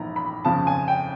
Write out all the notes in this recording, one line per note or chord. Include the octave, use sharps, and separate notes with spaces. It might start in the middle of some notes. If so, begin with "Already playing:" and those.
Already playing: A#1 G#2 E3 A#5 B5
B5
F2 C#3 F3 A5
G#5
G5